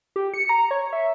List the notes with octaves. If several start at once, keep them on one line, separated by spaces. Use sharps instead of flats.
G4
C#7
A#5
C#5
E5